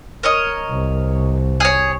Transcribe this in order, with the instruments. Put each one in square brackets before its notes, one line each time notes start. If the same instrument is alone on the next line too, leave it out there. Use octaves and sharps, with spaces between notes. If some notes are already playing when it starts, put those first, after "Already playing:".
[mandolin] A#4 C#5 D#5
[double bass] C2
[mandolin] G#4 C#5